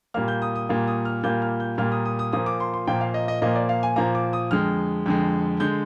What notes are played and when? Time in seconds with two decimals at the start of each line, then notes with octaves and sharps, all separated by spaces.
0.14 A#2 G3 A#3 F6
0.28 G6
0.42 D#6
0.56 D#6
0.69 A#2 G3 A#3
0.87 D#6
1.05 F6
1.23 A#2 G3 A#3 G6
1.42 F6
1.60 G6
1.78 A#2 G3 A#3 F6
1.92 D#6
2.05 D#6
2.19 D#6
2.33 A#2 F3 A#3 D#6
2.46 D6
2.60 C6
2.74 C6
2.87 A#2 F3 A#3 G5
3.01 F5
3.14 D#5
3.28 D#5
3.42 A#2 F3 A#3 D#5
3.56 D5
3.69 F5
3.83 G#5
3.96 A#2 F3 A#3 A#5
4.15 D6
4.33 D#6
4.51 F2 D3 G#3 F6
5.06 F2 D3 G#3
5.60 D3 G#3 G6